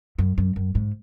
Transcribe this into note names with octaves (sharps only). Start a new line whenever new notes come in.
F#2
F#2
F#2
G#2